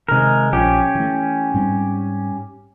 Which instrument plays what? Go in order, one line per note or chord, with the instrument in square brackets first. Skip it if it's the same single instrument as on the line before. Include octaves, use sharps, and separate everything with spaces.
[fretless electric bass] C3 D#3 [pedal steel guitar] G#3 A#4
[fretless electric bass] A#1 F3 [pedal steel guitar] C#4 G4
[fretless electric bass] E3 A3
G#2 G3 C4